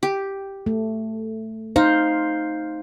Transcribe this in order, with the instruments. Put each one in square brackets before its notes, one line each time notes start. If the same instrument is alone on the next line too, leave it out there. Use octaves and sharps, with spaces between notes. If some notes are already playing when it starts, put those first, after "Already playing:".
[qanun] G4
[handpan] A3
[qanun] D#4 [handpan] C5 F5